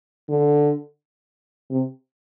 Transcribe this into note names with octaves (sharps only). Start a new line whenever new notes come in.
D3
C3